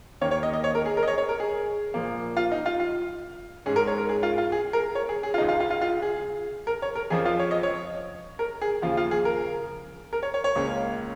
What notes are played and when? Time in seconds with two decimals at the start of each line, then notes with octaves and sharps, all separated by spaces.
0.21 D#2 D#3 A#3 C#4 C#5
0.31 C#5
0.43 D#5
0.53 D#5
0.64 C#5
0.75 A#4
0.86 G#4
0.97 A#4
1.03 D#5
1.08 C#5
1.18 C#5
1.29 A#4
1.40 G#4
1.94 A#2 F3 A#3
2.37 F4
2.52 D#4
2.66 F4
2.80 F4
3.66 G#2 G#3 C#4 G#4
3.76 A#4
3.87 C#5
3.98 A#4
4.09 G#4
4.23 F4
4.38 F4
4.52 G#4
4.73 A#4
4.95 C#5
5.09 G#4
5.23 G#4
5.34 F4
5.38 C#2 C#3 G#3 D#4
5.48 F4
5.60 F4
5.70 F4
5.81 F4
6.02 G#4
6.67 A#4
6.82 C#5
6.96 A#4
7.10 F2 F3 C#4 G#4
7.25 F4
7.39 C#5
7.51 D#5
7.63 C#5
8.39 A#4
8.61 G#4
8.82 D#2 C#3 F3 F4
8.97 F4
9.11 G#4
9.25 A#4
10.13 A#4
10.23 C#5
10.34 C#5
10.44 C#5
10.56 C#2 C#3 A#3 C#4